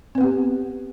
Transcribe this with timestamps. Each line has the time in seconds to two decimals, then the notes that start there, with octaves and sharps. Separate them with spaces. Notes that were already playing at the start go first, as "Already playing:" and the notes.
0.15 C4
0.18 B4
0.21 B3
0.23 G4